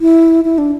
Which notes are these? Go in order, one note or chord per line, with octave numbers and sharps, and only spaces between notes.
E4
E4
D4